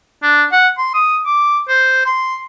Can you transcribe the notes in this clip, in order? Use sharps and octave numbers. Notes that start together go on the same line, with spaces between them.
D4
F#5
C6
D#6
D6
C5
C6